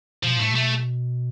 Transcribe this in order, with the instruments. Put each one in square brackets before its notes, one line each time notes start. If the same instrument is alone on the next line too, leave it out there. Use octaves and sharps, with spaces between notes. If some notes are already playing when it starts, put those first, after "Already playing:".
[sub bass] B2 [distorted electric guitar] F3
[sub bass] A2 [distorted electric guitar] A3
[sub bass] B2 [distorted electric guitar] A3